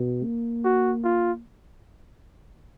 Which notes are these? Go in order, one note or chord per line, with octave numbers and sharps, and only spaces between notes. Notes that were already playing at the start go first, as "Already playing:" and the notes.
Already playing: B2
A#3
F#4
F4